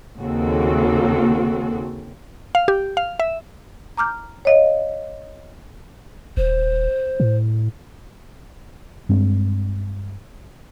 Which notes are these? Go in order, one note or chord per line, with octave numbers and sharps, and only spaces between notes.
D#2 C#3 A#3 C4 F#4 A4
F5
G4
F5
E5
A#5 D6 F6 G6
C#5 D#5 F5
D#1 C5
A2
G2 G#3 C4 D4